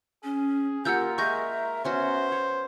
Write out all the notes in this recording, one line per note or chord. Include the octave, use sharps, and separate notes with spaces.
C#4 G#4
A#3 F4 G4 A#4 F#5 E6 G6
G#3 E5 C#6 G6 A#6
B3 C#4 F#4 C5
C#5